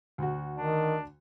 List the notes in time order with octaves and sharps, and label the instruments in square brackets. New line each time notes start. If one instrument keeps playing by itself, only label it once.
[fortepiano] D2 F#4
[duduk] D#3 [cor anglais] D4